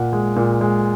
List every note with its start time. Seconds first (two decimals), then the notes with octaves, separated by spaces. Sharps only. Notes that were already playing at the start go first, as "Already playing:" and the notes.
Already playing: A#2 F#5
0.13 G#3
0.36 A#2
0.61 G#3